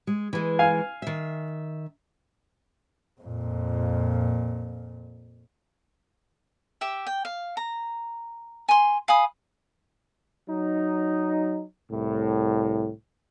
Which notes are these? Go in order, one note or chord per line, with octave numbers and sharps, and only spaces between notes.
G#3
E3 G#3
F5 G#5
D#3 E5
F2 A#2
G4 E5 G5
G5
F5
A#5
G#5 C6
F5 G#5 B5 D#6
F#3 D#4
C2 A2